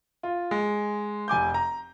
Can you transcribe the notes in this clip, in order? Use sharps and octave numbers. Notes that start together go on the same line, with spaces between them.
F4
G#3
F1 G#5 D6 G6
A#5